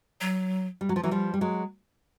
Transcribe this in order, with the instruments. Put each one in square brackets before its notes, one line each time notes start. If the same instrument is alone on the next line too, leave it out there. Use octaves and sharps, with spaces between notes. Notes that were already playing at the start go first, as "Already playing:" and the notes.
[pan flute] F#3
[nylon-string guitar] G3
F#3
F3
E3 F#3
F3 G3
G3
F#3 G#3